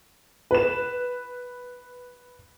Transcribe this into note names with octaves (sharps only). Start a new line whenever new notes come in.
B4 E7